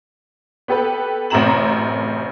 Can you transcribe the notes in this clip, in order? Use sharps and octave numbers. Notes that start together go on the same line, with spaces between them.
B3 G4 A4 B4
A1 F#2 C3 A#5 E7 F#7